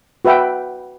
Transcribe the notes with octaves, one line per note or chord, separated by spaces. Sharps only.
F#4 B4 E5 G5